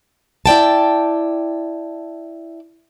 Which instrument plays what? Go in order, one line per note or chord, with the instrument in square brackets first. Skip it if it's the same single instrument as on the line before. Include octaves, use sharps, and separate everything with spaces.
[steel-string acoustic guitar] E4 D5 G5 A5